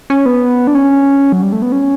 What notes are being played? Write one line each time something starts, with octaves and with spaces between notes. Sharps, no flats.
C#4
B3
D4
C#4
F#3
G3
A3
B3
C#4